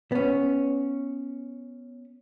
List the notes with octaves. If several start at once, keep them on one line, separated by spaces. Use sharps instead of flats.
B3 C#4